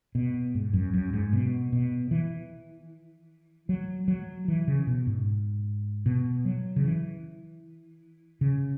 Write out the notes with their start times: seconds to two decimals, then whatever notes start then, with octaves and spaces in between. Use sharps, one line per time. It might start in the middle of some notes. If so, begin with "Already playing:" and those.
0.15 B2
0.55 G#2
0.73 F#2
0.94 F#2
1.13 G#2
1.33 B2
1.72 B2
2.11 E3
3.69 F#3
4.08 F#3
4.48 E3
4.68 C#3
4.87 B2
5.07 G#2
6.06 B2
6.45 F#3
6.76 C#3
6.84 E3
8.41 C#3